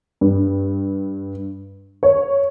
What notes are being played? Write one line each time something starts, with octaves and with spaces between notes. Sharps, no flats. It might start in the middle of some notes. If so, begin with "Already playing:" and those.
G2
C#5